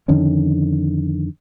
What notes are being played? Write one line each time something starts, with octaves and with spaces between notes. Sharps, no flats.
F2 D3 D#3 C#4